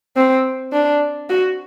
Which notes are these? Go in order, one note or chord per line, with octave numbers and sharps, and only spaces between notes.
C4
D4
F#4